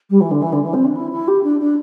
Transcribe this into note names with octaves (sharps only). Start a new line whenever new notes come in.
G3
E3
D3
E3
D3
E3
C4
D4
E4
E4
G4
D4
D4